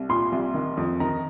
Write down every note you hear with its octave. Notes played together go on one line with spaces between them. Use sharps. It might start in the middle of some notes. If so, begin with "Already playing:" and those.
Already playing: C2
A#2 C6
C2
D#3
F2
D#3 A#5